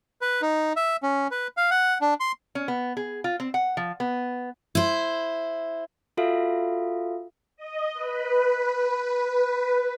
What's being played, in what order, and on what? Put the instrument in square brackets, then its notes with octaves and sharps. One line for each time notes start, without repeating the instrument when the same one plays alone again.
[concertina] B4
D#4
E5
C#4
B4
F5
F#5
D4
C6
[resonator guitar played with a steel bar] C#4
B3
G#4
F4
C4
F#5
F3
B3
[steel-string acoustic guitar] E4 C5
[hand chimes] F4 F#4 A4 E5 F5
[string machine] D#5
B4